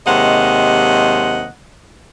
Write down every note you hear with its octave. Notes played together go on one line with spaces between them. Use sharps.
D#2 C3 G#3 D#5 F#5